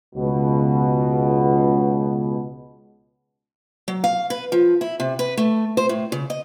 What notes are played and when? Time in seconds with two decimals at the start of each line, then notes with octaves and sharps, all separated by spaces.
0.16 C#2 B2
3.88 F#3
4.04 F5
4.30 B4
4.52 F3
4.81 E4
5.00 C3
5.19 B4
5.37 A3
5.77 C5
5.89 A2
6.12 C#3
6.30 D#5